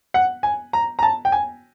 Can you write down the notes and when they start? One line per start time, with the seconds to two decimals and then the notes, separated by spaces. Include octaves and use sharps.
0.14 F#5
0.43 G#5
0.73 A#5
0.99 A#5
1.03 A5
1.25 G5
1.32 G#5